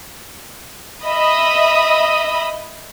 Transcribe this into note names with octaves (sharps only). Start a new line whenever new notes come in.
D#5 E5 B5 D#6